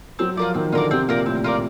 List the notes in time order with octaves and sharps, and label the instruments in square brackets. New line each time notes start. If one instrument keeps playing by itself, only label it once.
[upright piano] F#3 [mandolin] C4
[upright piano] F3 [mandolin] F4 A#4 D5
[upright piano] D#3 [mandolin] C4
[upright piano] D3 [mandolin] F4 A#4 D5
[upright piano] C3 [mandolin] C4
[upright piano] A#2 [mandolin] F4 A#4 D5
[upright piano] A2 [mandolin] C4
[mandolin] F4 A#4 D5